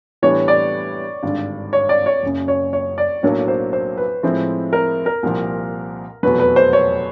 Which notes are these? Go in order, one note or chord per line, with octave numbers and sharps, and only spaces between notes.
A2 E3 G3 B3 D4 C#5
D5
G#1 G2 D3
C#5
D5
C#5
F#1 F#2 C#3
C#5
C#5
D5
B1 A2 F#3 A#3 D4 C#5
C5
C5
B4
A2 F3 G#3 C4 E4
A#4
A#4
C2 A#2 F3
F1 E2 B2 F#3 B4
B4
C5
C#5